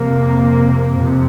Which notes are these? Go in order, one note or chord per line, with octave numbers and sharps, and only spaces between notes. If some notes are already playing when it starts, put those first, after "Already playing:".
Already playing: F2 C3 A#3
F2 C3